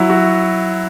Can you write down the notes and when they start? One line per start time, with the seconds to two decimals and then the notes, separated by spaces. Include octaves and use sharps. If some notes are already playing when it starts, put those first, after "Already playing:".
Already playing: F#3 E4
0.10 F#4